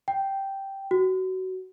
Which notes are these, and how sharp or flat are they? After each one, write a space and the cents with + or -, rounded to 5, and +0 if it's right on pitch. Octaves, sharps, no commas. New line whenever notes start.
G5 -5
F#4 +20